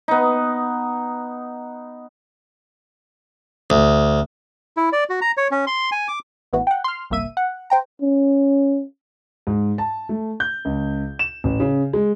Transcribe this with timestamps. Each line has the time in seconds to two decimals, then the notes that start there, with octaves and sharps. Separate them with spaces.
0.08 B3 D#4
3.70 D2
4.77 E4
4.93 D5
5.09 F#4
5.21 A#5
5.37 C#5
5.51 C#4
5.67 C6
5.92 G#5
6.08 D6
6.53 A1 E3 B3 F#4
6.67 F#5 G5
6.84 C6 F6
7.10 G1 C2 A#3 E5 D#7
7.37 F#5
7.70 C5 G5 A#5
8.02 C#4
9.47 G#2
9.78 A5
10.09 A3
10.40 G6
10.65 C#2
11.19 E7
11.44 A1
11.60 C#3
11.93 G#3